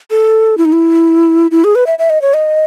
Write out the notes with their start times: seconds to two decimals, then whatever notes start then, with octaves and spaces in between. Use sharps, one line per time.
0.11 A4
0.58 E4
0.65 D#4
0.73 E4
1.51 E4
1.64 G#4
1.75 B4
1.87 E5
1.99 E5
2.10 D#5
2.22 C#5
2.34 D#5